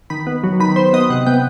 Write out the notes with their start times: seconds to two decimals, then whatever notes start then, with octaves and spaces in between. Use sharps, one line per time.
0.10 D#3 B5
0.27 B3
0.44 F#3
0.60 D#3 B5
0.76 D#3 C5
0.93 B3 D#5
1.10 C3 F#5
1.26 B3 G5